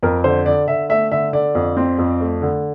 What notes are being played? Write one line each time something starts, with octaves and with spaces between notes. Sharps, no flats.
F2 A#4
D3 C5
D3 D5
D3 E5
A3 E5
D3 E5
D3 D5
F2
C4
F2
A3
D3